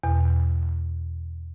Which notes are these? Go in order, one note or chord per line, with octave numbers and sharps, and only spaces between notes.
E2 B2